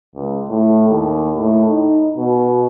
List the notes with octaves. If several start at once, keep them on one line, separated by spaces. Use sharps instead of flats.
C#2
A2
D#2
A2
D#4
B2